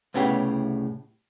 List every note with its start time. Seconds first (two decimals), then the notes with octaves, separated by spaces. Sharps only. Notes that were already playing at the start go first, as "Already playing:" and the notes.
0.14 C2 A2 C#3 B3 G4